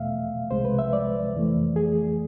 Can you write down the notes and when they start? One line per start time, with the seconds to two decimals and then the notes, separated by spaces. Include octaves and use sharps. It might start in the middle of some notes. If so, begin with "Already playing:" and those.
Already playing: E2 B2 A3 E5 F5
0.51 C2 C3 G#3 C5
0.65 B4
0.79 E5
0.93 D5
1.35 F2 E3 A3
1.76 G#4